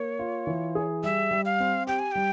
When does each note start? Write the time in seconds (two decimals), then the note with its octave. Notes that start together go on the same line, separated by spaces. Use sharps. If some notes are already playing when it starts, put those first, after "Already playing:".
Already playing: A#3 C#5
0.19 F4
0.47 E3
0.75 G#4
1.03 G3 E5
1.31 G3
1.45 F5
1.60 C4
1.87 G4 G5
1.99 G#5
2.12 G3 G5